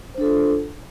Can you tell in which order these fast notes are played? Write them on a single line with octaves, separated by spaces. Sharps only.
C5 D4 A4 F4